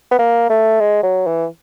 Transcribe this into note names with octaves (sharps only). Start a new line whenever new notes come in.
B3
A#3
A3
G#3
F#3
E3